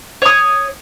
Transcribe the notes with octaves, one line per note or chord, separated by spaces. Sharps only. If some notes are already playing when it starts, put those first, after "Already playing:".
C#5 D#6